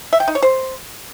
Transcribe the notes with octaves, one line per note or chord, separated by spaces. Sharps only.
E5
G5
D#4
C#5
C5